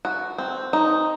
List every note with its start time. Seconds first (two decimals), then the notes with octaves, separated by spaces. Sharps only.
0.05 F#4
0.38 C4
0.73 D#4